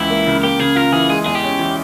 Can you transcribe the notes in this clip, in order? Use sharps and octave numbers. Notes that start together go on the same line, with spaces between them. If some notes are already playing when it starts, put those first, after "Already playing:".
Already playing: C#2 E3 E4
A#3
C#3
A#3 G4
C#3 G#4
F4 A#4
E3 G#4
G#3 G#4
E2 G#4
G4
C#4
E3